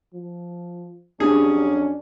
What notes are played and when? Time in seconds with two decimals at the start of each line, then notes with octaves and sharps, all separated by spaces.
0.14 F3
1.20 F2 F#3 C#4 D4 G4 G#4